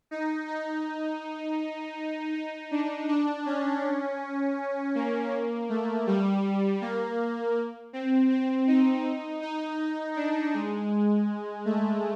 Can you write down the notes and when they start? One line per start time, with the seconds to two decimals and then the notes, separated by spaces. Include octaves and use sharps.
0.11 D#4
0.48 D#4
2.35 D#4
2.71 D4
3.09 D4
3.46 C#4
4.95 A#3
5.69 A3
6.07 G3
6.81 A#3
7.93 C4
8.30 C4
8.67 D#4
9.42 D#4
10.16 D4
10.54 G#3
11.65 A3